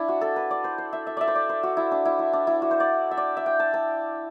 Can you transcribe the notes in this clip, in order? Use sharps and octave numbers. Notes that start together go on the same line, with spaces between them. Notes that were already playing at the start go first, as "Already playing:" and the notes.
Already playing: D4 E4
F#4
A4
B4
D5
C5
C5
E5
E5
D5 E5
C5
D5
C5
F#4
E4
D4
E4
E4
D4
E4
F#4
C5
D5
E5
D5
E5
G5
A5
A5